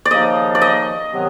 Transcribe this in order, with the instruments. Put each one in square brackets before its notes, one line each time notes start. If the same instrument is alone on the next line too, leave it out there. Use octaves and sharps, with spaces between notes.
[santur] D5
[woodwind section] D#2 C#3 F3 A#3 D#4 [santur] D#5
[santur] D5
D#5
[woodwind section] C3 D#3 F#3 B3